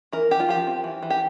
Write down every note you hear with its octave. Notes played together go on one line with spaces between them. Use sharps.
E3 A#4
E3 G4
F4
F3 G4
C4
E3
E3
G4